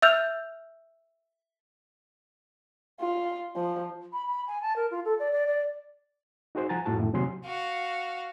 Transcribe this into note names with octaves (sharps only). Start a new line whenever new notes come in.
E5 E6 F6 G6 F7
F4
F3
B5
B5
G#5
A5
A#4
F4
A4
D5
D5
D5
D#4 F#4 G#4 C5
F3 F#5 G#5 A#5 A6
F2 A2 F3 F#4 A5
F#2 A2 D#3
D#2 C3 F#3 G#5 C6
F#4 F5